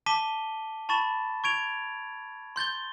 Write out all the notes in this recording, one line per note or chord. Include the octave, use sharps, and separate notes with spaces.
A5 D6 B6 D#7 G7
A5 B5 C#6 A6 E7
C#6 G#6 D7 F7
C6 G6 A6 G7